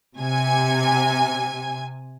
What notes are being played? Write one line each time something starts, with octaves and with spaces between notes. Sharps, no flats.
C3 G#5